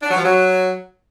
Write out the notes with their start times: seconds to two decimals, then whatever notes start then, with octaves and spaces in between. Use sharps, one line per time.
0.02 D4
0.10 F#3
0.17 F3
0.24 F#3